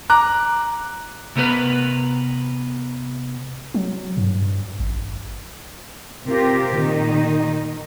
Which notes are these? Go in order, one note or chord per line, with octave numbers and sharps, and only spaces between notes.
A#5 D6 F#6
C3 B3 A#4 B4
F#3
G2
G#1
C3 C4 F4 G4 A#4
A#2 D#3 D#4